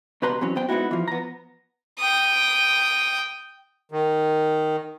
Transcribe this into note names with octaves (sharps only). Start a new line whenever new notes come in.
C#2 B2 G4 B4 A#5 C6
E3 F#3 C4 C#4
B3 C5 G5
G#3 B3 C#4 D#4 E4 F#4
E3 F3
B3 A#5
G5 D#6
D#3